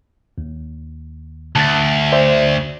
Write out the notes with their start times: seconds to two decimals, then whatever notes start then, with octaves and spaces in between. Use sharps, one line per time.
0.38 D#2
1.56 D2 A5 A6
2.12 C5 D5 E5